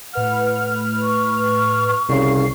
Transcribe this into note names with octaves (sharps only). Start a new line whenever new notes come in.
A2 B4 F#5 F6
C#6
C2 C#3 C7